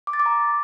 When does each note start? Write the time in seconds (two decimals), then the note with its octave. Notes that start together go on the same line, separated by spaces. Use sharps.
0.07 D6
0.13 A6
0.20 D6
0.26 A#5